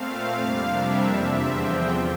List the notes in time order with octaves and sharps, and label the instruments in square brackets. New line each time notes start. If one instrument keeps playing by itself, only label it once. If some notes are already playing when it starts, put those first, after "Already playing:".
Already playing: [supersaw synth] A#2 A3 C4 F5
F2 C3 G3 A#3 D4
E5
E2 D3 F3 C4 E5
G5